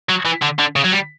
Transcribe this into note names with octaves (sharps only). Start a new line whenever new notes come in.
F#3
E3
D3
D3
C#3
F#3
G3